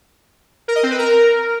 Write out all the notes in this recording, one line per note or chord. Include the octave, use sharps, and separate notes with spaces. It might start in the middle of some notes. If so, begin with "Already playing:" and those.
A#4
D#5
C4
B4
A#4